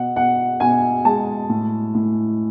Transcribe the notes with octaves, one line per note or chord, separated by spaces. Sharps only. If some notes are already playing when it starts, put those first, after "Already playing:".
Already playing: B2 F#5
B2 F#5
B2 G#5
G#3 A5
A2
A2